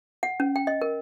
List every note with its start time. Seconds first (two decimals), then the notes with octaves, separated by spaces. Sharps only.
0.23 F#5
0.40 C#4
0.56 G5
0.67 D#5
0.82 A#4